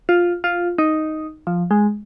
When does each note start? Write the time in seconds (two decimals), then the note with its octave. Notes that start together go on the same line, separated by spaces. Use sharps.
0.09 F4
0.44 F4
0.78 D#4
1.47 F3
1.71 G#3